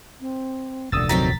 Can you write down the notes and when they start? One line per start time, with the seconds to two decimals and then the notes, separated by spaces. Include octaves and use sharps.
0.21 C4
0.92 F1 D2 A#2 D3 D#6 E6 A6
1.09 D#3 F#3 C4 A#5 A6 B6